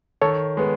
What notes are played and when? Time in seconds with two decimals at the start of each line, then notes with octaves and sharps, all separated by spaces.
0.22 D#3 A4 C#5
0.57 G#3 B3